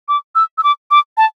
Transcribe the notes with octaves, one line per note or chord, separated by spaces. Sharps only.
D6
E6
E6
D6
D6
A5